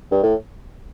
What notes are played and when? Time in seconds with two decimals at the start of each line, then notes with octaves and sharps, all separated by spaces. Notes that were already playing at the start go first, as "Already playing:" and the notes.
0.11 G2
0.23 A2